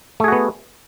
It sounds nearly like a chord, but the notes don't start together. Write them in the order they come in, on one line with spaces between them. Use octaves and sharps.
A3 G#4 F#4 B3